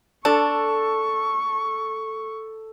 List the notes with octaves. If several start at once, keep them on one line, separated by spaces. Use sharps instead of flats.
D4 A4 C#6